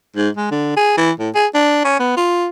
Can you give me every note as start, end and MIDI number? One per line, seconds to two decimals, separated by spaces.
0.16 0.29 44
0.37 0.49 56
0.51 0.75 50
0.77 0.94 68
0.97 1.11 52
1.19 1.30 45
1.35 1.46 68
1.54 1.80 62
1.84 1.99 61
2.00 2.13 59
2.17 2.48 65